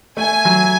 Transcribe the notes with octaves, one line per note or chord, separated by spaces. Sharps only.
A3 G#5
F#3